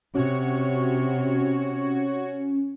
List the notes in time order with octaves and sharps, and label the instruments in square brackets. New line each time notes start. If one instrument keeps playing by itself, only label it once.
[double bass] C3 [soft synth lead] C#4 [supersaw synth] F#4 C#5 C#6